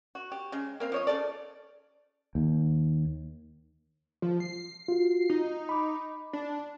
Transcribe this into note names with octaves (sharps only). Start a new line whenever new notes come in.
F#4
G4
C#3 G#3
A#3 C4 F5
F3 C#5 D#5
C#3 G#3 A4 D5
D#2
F3
C7
F4 F#4
D#4
B5 D6
D4